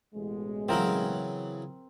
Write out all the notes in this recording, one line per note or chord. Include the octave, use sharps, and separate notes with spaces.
A1 B2 G#3
C#3 E3 F#3 C4 A#4